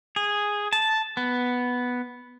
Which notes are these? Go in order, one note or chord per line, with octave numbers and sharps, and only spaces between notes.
G#4
A5
B3